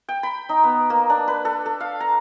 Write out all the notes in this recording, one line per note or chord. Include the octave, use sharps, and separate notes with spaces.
G5
B5
D#4
B3
A#3
D4
B4
A4
A4
F5
A#5